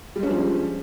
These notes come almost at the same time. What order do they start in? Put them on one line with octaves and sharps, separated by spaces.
G3 G#3 C#4 D4 F3